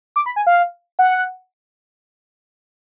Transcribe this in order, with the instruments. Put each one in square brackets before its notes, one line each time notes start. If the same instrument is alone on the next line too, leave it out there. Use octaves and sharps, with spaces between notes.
[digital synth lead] D6
B5
G#5
F5
F#5